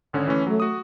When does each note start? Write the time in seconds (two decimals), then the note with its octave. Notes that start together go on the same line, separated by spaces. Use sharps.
0.13 G#1 D3 C#4
0.28 E3 A3 C#4
0.47 F#3 A3
0.60 F#4 D#6